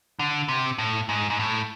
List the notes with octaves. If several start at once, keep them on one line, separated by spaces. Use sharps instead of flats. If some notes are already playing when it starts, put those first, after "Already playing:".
D3
C3
A2
G#2
G#2
A2